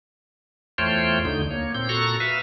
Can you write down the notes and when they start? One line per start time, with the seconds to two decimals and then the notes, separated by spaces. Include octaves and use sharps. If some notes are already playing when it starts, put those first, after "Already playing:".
0.78 E2 A3 F4 C5 C#5 G5
1.25 D2 D3 D#4 G6
1.51 A#3 C#5
1.75 A#2 C4 G6
1.89 A#2 F#4 A4 A#5 C#6
2.20 B4 E5 F5